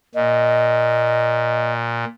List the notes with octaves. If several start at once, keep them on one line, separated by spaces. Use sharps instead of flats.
A#2 D#5